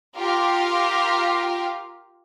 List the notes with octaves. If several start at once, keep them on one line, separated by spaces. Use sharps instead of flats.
F4 G4 A#4 F5